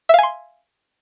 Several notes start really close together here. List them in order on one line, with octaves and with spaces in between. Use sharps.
E5 F5 G#5 C6